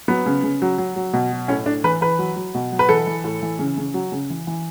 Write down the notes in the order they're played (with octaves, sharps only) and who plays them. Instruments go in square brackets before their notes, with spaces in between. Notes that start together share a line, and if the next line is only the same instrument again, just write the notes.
[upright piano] F#3 B3
C#3
C#3
F#3
F#3
F#3
B2
F#3
A2 C#4
A2 D4
E3 B4
E3 B4
F#3
F#3
B2
F#3
B4
E3 A4
E3
A2
E3
C#3
C#3
F#3
C#3
E3
E3